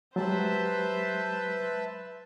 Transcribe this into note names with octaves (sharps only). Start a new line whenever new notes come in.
F#3 G#3 G4 B4 C5 E5 A5